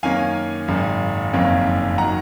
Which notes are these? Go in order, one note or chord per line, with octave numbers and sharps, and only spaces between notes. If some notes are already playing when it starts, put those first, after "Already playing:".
F#2 D#3 A#3 C#4 F5 G#5
G#1 F#2 C#3
F#1 F2 D#3 A#3 C#4
D#3 F#3 F#5 A#5